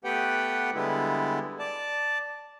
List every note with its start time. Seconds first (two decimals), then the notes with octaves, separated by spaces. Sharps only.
0.04 A3 B3 G4 B4 F#5 G5
0.74 D3 G3 G#3 B3 E4
1.59 D5 A5